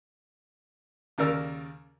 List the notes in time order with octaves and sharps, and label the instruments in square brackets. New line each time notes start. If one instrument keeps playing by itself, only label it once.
[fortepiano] D#2 C#3 A#4 D5 E6 F6